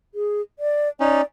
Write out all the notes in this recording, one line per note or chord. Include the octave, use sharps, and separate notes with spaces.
G#4
D5
C#4 D#4 D5